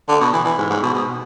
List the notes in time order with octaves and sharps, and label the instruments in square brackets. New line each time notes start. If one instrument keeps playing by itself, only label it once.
[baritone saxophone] D3
B2
E3
E3
G#2
G#2
B2
B2